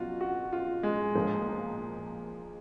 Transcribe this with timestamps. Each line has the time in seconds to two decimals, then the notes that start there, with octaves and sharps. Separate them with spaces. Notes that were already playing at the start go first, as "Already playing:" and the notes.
Already playing: B2 F#3 F4 F#4
0.21 F#4
0.53 F4
0.83 G#3
1.15 A#2 F3 A#3 F4 G#4